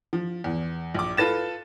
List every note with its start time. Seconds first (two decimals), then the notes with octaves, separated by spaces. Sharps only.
0.13 F3
0.44 E2
0.94 A#1 D6
1.17 F4 A4 B4 A6 E7